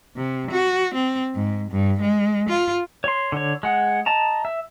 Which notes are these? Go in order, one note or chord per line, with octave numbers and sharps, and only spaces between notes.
C3
F#4
C4
G#2
G2
G#3
F4
C#5 C6
D3 C#5
G#3 F#5
D#5 A5 A#5
E5